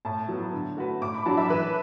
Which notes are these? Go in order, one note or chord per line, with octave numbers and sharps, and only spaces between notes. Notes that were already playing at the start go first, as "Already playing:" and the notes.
A2 A5
F#3 B3
D3
A3 F#4 B4
A2 D6
B5
F#3 D4 F#4 A5
E5
E3 B4